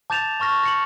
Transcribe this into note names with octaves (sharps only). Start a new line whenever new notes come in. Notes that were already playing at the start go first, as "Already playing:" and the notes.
A5 D6 G6 A6 E7 F7
A5 C#6 F6 A#6
A#6 C#7 F#7